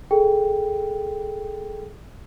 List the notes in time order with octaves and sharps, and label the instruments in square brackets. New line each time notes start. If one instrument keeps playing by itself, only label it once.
[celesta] G#4 A4 G5